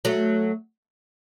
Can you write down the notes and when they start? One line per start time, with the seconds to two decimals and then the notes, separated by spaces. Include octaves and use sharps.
0.05 F#3 A3